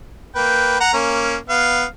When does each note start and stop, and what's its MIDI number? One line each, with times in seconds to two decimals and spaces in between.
0.36 0.79 58
0.36 0.79 71
0.36 0.79 79
0.80 0.93 78
0.80 0.93 82
0.94 1.36 58
0.94 1.36 61
1.49 1.85 59
1.49 1.85 77